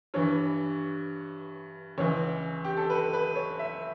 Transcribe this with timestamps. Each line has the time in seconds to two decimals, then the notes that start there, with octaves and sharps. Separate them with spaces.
0.14 G2 E3 C#5
1.98 C#2 C#3 E3 C#5
2.65 G4
2.77 A4
2.90 B4
3.13 B4
3.36 C#5
3.59 E5